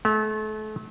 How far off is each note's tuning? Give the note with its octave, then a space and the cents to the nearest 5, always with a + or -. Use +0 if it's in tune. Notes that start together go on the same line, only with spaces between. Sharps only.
A3 -35